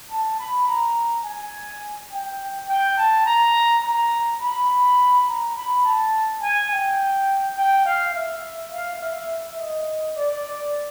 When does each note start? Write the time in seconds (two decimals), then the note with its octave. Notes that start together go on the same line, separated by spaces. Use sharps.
0.10 A5
0.39 B5
0.67 A#5
1.25 G#5
2.11 G5
2.69 G5
2.97 A5
3.26 A#5
3.84 A#5
4.41 B5
5.28 A#5
5.56 B5
5.84 A5
6.42 G#5
6.71 G5
7.57 G5
7.86 F5
8.15 E5
8.72 F5
9.01 E5
9.58 D#5
10.16 D5